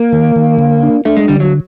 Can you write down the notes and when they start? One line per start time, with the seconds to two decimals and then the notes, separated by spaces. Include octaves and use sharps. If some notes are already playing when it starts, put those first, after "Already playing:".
Already playing: A#3
0.13 D#3
0.36 D#3
0.59 D3
0.83 D4
1.05 A3 D4
1.17 G#3
1.28 D3 G3
1.40 F#3